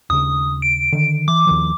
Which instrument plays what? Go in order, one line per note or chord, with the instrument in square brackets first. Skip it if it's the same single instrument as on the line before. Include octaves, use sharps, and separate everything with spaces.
[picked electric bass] D#2 C#3 [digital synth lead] D#6
[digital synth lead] D7
[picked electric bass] D3 D#3
[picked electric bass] E3 [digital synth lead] D6
[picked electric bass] D#2 D#3 F3